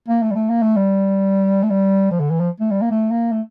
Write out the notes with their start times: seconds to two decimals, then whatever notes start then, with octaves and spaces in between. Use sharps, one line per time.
0.08 A#3
0.22 A3
0.31 G3
0.35 A3
0.49 A#3
0.62 A3
0.76 G3
1.63 A3
1.70 G3
2.11 F3
2.20 D3
2.31 E3
2.40 F3
2.60 A3
2.71 G3
2.81 A#3
2.91 A3
3.11 A#3
3.32 A3